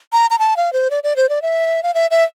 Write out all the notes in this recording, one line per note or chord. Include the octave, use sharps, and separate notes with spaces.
A#5
A#5
A5
F5
C5
D5
D5
C5
D5
E5
F5
E5
E5